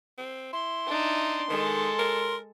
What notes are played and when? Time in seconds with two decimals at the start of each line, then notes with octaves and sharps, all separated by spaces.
0.18 C4
0.53 E4 C6
0.86 D4 D#4
1.50 D#3 G#3 A4
1.99 A#4